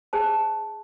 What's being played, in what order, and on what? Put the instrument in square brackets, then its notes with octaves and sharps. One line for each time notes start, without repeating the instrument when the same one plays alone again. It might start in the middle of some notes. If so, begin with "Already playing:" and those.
[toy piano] G#4 C5 A5